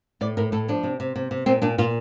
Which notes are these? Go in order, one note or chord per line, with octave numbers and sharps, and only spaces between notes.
A2 D5
A2 A#4
A2 A4
F3 D4
C3
C3
C3
C3
A#2 C4
A#2 D4
A#2 F4